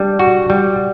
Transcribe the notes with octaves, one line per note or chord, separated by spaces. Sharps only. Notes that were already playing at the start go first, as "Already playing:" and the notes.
Already playing: G3 D4
F#4
G3